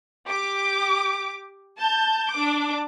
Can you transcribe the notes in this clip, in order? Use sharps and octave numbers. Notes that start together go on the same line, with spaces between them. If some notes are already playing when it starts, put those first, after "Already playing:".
G4 D6
A5 G6
D4 D6